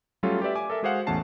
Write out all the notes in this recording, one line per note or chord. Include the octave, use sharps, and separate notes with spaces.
F#3 G3 A3 C#4 F4 A4
G4 B4 D5 E5
G#5 D6
A4 A#4 E5
G#3 F#4 G#4 C5 F5 F#5
A1 E2 A3 C#4 A5 C7